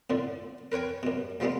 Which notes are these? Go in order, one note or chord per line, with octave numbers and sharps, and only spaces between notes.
F2 A2 D3
A#4 B4 C#5 G5 G#5
F#2 B2
C#2 F3 G3 G#3 A#3 B3